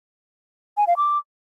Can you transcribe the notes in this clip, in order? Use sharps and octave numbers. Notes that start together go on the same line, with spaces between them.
G#5
F5
D6